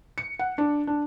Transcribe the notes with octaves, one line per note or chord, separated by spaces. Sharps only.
C#7
F#5
D4
D4